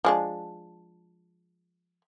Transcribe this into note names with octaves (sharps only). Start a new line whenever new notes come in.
F3 G#3 D4